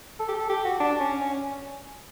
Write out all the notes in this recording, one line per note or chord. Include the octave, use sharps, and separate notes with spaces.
A4
G4
A4
G4
F#4
D4
C#4
C#4